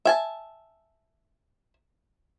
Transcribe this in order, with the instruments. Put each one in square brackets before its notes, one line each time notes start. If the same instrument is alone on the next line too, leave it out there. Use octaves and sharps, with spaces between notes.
[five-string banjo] E5 G#5 A5